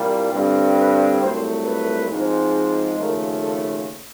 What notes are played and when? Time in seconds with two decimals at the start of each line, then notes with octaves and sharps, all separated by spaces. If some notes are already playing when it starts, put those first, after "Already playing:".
Already playing: C2 A#2 G3 A#3
0.31 G2 D3 G3 C4
0.76 B4
1.21 C2 A#2 F#3 A3 C5
1.65 B4
2.09 G#2 F3 G#3 C4
2.98 D#2 C#3 F3 A3 A#4
3.42 A4